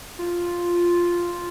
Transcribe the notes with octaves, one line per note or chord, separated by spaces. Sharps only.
F4